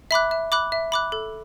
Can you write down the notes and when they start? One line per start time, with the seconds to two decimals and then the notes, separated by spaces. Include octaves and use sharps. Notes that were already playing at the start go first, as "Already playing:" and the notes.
0.11 E5 B5 D6 F#6
0.31 E5
0.52 B5 D6 F#6
0.72 E5
0.92 B5 D6 F#6
1.12 A4